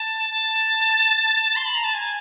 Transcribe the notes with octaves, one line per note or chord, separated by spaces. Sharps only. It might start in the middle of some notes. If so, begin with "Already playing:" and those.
Already playing: A5
A5
C6
B5
A#5
A5
G#5